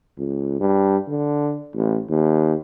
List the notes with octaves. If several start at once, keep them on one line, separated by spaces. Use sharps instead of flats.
C#2
G2
D3
A1
D#2